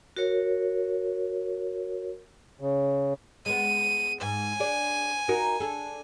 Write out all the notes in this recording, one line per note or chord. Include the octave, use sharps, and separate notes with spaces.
F#4 A#4 C#5
C#3
G#3 B3 D#7
G#2 G#5
D4 G#4 D5
D#4 F#4 A#4
D4 G#4 A4